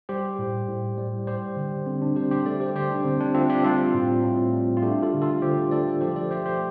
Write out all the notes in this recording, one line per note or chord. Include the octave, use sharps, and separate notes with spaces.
G3 G4 C5
A2
A2
G3
G3 G4 C5
D3
D3 C4
D4
G3 G4 C5
G4 C5
A3 A4 D5
G4 C5
D3 G4 C5
D4
D3 C4
D4
A3 C4 F4
D4 G4
G3 C4 F4
A2
A2
G3
F4
A3 D4 G4
F4 A4
D3
F4 A4
D3 G4 C5
A3 A4 D5
F3 G4 C5
A4 D5
A3 G4 C5
G4 C5